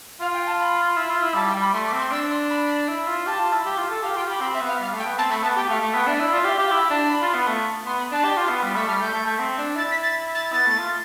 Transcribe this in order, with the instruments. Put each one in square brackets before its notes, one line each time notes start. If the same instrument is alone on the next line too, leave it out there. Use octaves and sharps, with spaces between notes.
[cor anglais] F4 [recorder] F5
[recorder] G5
A5
B5
[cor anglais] E4
F4
E4
[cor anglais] G3 [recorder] A5
[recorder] G5
[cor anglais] G3
[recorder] B5
[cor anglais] A3 [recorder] C6
[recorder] D6
[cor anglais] C4
[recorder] C6
[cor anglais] D4 [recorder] E6
[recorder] C6
B5
[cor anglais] E4
F4
[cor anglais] G4 [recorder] A5
[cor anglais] F4
E4
G4
F4
A4
[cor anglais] G4 [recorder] F5
[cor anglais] F4 [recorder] G5
[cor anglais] G4 [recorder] B5
[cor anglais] C4 [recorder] B5
[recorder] E5
[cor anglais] B3
[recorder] F5
[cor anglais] G3 [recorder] F5
[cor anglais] A3
[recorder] G5
[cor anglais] B3
[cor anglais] C4 [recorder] A5
[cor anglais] A3 [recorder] B5
[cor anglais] B3 [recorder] A5
[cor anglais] G4 [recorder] G5
[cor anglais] A3 [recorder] F5
[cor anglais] A3
[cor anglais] B3 [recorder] G5
[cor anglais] D4 [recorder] E5
[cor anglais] E4 [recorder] D5
[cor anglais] F4 [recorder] D5
[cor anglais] G4 [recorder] E5
[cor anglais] G4 [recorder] F5
[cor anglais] E4 [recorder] G5
[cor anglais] D4 [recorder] A5
[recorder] B5
[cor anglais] F4
B3
A3
[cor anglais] B3 [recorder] C6
[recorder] B5
[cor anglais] D4 [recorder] A5
[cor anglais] G4
F4
B3
G3
[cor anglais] A3 [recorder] E6
[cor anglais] G3 [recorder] F6
[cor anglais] A3 [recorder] G6
[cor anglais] A3
A3
C4
D4
[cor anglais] E4 [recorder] A6
[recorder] B6
A6
A6
[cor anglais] B3 [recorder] A6
[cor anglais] A3
F4